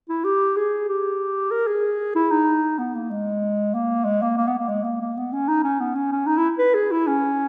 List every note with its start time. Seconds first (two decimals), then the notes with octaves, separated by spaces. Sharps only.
0.09 E4
0.24 G4
0.56 G#4
0.88 G4
1.51 A#4
1.67 G#4
2.16 E4
2.31 D#4
2.79 B3
2.95 A#3
3.11 G#3
3.74 A#3
4.05 G#3
4.22 A#3
4.37 A#3
4.47 B3
4.58 A#3
4.69 G#3
4.84 A#3
5.01 A#3
5.17 B3
5.33 C#4
5.48 D#4
5.64 C#4
5.80 B3
5.95 C#4
6.12 C#4
6.27 D#4
6.37 E4
6.58 B4
6.74 G#4
6.91 E4
7.07 C#4